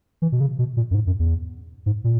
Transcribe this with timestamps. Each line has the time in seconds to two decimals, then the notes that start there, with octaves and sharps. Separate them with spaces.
0.22 E3
0.32 B2
0.40 C#3
0.59 B2
0.77 A#2
0.91 F#2
0.95 G#2
1.07 F#2
1.19 E2
1.86 G#2
2.04 A#2